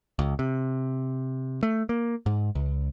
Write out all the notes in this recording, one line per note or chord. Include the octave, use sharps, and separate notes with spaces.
C#2
C3
A3
A#3
G#2
C#2